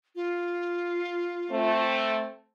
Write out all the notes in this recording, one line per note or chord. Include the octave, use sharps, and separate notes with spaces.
F4
A3 C4